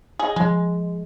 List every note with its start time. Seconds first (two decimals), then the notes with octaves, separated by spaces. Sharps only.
0.19 G#4 D#5
0.36 F3 G#3